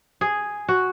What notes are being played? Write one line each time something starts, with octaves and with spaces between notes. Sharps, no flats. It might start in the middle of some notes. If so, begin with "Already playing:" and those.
G#4
F#4